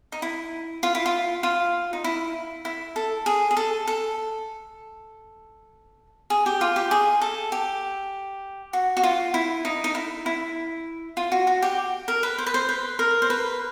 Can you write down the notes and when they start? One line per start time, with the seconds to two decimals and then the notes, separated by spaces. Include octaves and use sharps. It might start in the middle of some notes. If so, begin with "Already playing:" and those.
0.12 D#4
0.22 E4
0.83 F4
0.95 E4
1.06 F4
1.43 F4
1.93 D#4
2.04 E4
2.65 E4
2.96 A4
3.26 G#4
3.51 G#4
3.57 A4
3.87 A4
6.30 G#4
6.46 G4
6.61 F4
6.76 G4
6.91 G#4
7.22 A4
7.52 G4
8.73 F#4
8.97 F#4
9.03 F4
9.34 E4
9.65 D#4
9.84 D#4
9.95 E4
10.26 E4
11.17 F4
11.32 F#4
11.47 F#4
11.62 G4
12.08 A#4
12.23 B4
12.38 C5
12.46 B4
12.54 C5
12.69 B4
12.99 A#4
13.22 C5
13.30 B4